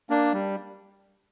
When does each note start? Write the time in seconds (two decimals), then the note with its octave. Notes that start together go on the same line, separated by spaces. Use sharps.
0.10 A#3 D4
0.33 G3